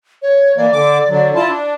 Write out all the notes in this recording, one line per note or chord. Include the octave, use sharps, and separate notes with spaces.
C#5
E3 A#3 D5
D3 D6
D3 F#3
E4 F4 A5
D4